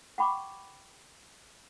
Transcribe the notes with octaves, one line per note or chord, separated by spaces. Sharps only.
F#5 G5 B5 C#6 D6